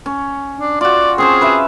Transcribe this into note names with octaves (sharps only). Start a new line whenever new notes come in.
C#4
D4
F4 F#4 D5
C4 C#4 G#4 C5
B4 E5 F5